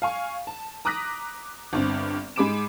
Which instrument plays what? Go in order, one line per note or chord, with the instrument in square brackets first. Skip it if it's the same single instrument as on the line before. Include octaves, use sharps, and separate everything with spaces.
[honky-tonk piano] F5 G#5 C#6
A5
A#5 D6 D#6 F#6 A#6 B6
G1 G2 C4
G#2 G#3 B5 D6 D7 E7